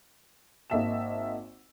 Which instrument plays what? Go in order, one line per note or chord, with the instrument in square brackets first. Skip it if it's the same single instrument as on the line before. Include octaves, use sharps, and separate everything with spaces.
[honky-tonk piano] G#1 A#3 D#5 E5 A5 E7